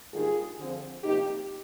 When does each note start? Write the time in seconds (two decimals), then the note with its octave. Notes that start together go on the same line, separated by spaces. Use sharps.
0.12 G#2 D#3 G3 A#3 D4 F4 G#4
0.57 D3 F3 C4
1.03 C3 F3 A#3 D#4 G4